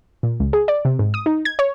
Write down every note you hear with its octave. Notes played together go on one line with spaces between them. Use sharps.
A#2
C#2
G#4
D5
C3
G#2
D#6
D#4
G#6
C#5